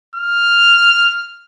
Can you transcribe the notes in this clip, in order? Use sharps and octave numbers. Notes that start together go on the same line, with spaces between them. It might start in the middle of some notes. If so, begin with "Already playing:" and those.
F6